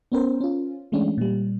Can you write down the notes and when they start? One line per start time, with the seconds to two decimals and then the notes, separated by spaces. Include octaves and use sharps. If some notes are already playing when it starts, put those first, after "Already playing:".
0.12 B3 C#4 A#4 C5
0.41 C#4 F4
0.92 E3 G#3 A3 C#4 D4
1.18 A#2 G3